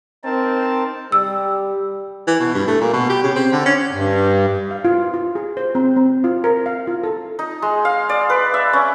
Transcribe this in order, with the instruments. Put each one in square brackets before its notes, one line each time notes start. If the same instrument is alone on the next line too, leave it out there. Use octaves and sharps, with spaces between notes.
[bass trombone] C4 [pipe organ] D#4 A#4 A5
[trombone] G3 [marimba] E6
[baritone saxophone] E3
B2
G2
A3
A#2
B2
G4
C#3
C4
D3
C#4
[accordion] G2
[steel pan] F5
F4
F4
G#4
C5
C4
C4
F4
A#4
F5
F4
A4
[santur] D#4
G#3
F5
D5
B4
E5
C#4